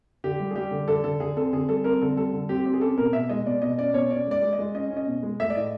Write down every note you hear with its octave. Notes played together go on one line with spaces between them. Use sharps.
D3 G4
G3
G#4
G3 G4
D3
D3 A4
D3 A4
D3 G#4
C4 A4
D3 G#4
G3 A4
C4 A#4
D3 A4
G3 A4
D3
C4 G4
C4 G4
G#4
C#4 A4
B2 A#4
B2 E5
G#3 D#5
B2 D5
B2 D#5
C#4 D5
B2 C#5
C#4 D5
G#3 D5
G#3
D#5
G#3
C#4 D#5
C#4
D#5
B2
G#3
A3 E5
D5
A2 D#5